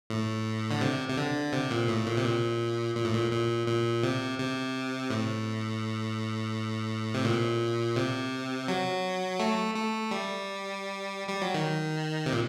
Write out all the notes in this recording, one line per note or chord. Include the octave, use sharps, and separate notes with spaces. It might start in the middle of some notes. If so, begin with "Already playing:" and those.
A2
D3
C3
C3
D3
C3
A#2
A2
A#2
C3
A#2
A#2
A2
A#2
A#2
A#2
C3
C3
A2
C3
A#2
C3
F#3
A3
A3
G3
G3
F#3
D#3
C3
A#2